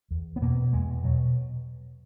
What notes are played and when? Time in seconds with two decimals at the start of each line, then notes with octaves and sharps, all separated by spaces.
0.11 E2
0.36 B3
0.42 B2 A#3
0.73 E2 G#3
1.04 B2 F#3